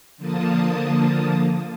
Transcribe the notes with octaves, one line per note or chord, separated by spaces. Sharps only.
D3 F3 A#3 A5 D#6